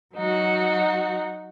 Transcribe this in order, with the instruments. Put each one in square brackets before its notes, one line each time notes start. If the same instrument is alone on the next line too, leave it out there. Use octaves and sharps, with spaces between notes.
[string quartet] F#3 D#4 F#4